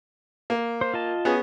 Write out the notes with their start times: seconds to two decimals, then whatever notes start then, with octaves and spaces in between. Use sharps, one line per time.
0.50 A#3
0.81 C5
0.94 F4 D#5 A5
1.25 B3 C#4 G#4